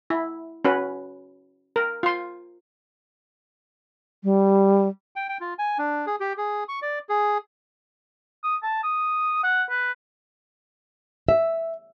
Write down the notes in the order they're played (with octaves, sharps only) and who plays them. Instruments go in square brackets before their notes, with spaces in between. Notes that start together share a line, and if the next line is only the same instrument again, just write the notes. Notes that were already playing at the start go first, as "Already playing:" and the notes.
[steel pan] E4
C#4 F#4 B4
A#4
F4 C6
[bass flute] G3
[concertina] G5
G5
F4
G#5
D4
G#4
G4
G#4
C#6
D5
G#4
[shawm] D#6
A5
D#6
F#5
B4
[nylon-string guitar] E5